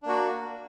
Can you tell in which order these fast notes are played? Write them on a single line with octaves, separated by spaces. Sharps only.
D4 A#3 F#4